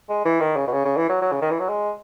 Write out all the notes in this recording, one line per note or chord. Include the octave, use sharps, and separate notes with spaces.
G#3
E3
D#3
C#3
B2
C#3
C#3
E3
F#3
F#3
C#3
D#3
E3
F#3
G#3